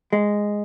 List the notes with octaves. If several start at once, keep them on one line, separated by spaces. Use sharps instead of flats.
G#3